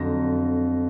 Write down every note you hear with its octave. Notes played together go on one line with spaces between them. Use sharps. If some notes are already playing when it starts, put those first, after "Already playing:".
Already playing: F2 D3 F#3 A#6